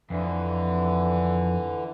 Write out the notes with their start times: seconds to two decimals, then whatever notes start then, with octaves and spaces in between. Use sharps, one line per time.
0.10 F2 D3 E3